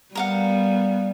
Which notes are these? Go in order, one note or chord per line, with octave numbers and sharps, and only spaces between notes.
G3 B3 A#4 F5 F#5